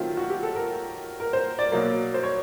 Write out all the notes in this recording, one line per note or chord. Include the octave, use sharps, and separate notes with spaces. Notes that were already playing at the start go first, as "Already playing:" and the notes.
Already playing: D#3 F#3 A3 C4 F4
F#4
G4
A4
A#4
A#4
C5
D5
B2 F#3 A#3
C5
C#5